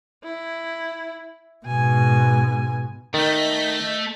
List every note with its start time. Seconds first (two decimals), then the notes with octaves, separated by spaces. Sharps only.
0.24 E4
1.66 G#2 B2 G#5
3.14 D#3 A3 D#5 G6 B6